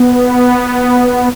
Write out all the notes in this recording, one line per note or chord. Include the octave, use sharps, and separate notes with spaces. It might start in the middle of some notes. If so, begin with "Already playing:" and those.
Already playing: B3